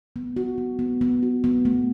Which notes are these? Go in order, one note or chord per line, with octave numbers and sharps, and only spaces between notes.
B3
F#4
B3
B3
B3
F#4
B3
A3